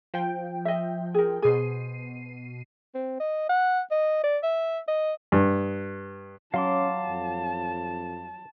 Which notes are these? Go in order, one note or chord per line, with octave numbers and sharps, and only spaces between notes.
F3 G5
D#5 E5
G#4 A#4
B2 G#4 C5 C7 D#7
C4
D#5
F#5
D#5
D5
E5
D#5
G2
F#3 C#4 F5 A5 C6 D6
F2